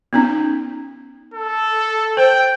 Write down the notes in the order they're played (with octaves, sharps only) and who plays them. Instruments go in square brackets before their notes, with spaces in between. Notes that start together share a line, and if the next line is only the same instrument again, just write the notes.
[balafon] B3 C#4 D#4
[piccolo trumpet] A4
[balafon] C5 [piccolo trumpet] G5